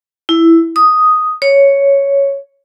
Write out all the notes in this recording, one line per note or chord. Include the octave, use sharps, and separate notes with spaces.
E4
D#6
C#5